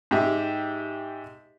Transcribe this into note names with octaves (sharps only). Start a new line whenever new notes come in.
G#2 G4 E5